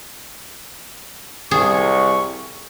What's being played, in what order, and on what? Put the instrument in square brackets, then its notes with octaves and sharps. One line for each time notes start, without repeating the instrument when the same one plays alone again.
[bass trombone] C2 [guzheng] G#4 [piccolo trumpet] C#6